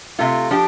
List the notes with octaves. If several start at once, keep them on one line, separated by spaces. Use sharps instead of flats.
C3 A3 F4
F3 D4 G4